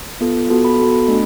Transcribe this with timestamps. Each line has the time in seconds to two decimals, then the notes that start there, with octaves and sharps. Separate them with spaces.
0.21 B3 F4 A4
0.50 B3 F#4 A4
0.65 B5
0.79 B3 F#4 A4
1.08 A3 D4